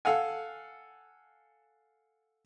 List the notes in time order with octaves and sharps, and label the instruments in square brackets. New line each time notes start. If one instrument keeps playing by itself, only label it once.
[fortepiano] A4 F5 F#5 G#5